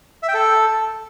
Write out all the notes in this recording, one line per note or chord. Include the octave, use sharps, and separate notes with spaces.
E5
G5
A4